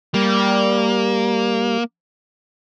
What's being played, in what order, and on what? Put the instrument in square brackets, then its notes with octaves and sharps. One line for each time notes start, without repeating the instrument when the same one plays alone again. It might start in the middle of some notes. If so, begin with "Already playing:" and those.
[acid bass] G3 [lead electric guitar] A#3